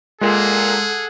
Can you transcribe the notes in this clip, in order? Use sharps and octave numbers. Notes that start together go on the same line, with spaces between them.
A#2 G#3 G#4 A4 F#5